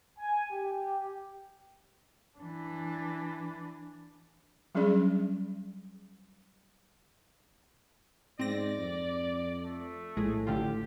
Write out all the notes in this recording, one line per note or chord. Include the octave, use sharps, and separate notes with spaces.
G#5
G4
E3 D4
F#3 G3 C#4 D4 G#4 D5
G#2 C4 D5 A#6
F2
A3
A#1 A2 G#3 G#4
A1 D3 F4 G4